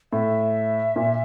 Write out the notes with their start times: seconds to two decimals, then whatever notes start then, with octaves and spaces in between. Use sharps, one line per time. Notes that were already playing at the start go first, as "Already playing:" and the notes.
0.12 A2 E5
0.96 A#2